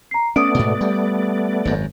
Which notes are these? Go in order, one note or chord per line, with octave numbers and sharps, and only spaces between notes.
A#5 C7
A3 B3 C#4 D5 D6 D#6 D7
G#2 B2
G3
G#1 F#2